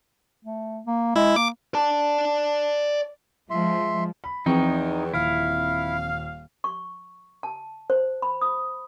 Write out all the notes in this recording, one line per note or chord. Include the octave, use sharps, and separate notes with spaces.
A3
A#3
G#3 E4
A#3 D6
D5 A5
F3 G#3 E5 C6
B5
E2 E3 F3 C4 D#4 G5 C#6
D#1 E4 F5
C#6
A5
C5
B5
D#6